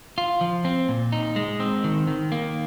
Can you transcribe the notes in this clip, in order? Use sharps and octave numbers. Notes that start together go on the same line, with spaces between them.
F4
F3
C4
A#2
D#4
G#3
C4
D#3
D#3
A#3